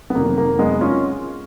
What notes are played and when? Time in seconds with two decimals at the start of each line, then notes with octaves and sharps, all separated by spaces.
0.10 B3
0.15 F1 F2 D#3 F#3 A#3
0.38 A#3
0.59 G#3 B3
0.81 C#4 F4